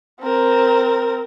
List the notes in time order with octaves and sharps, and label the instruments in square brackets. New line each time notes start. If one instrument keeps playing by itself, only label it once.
[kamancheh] C4 A#4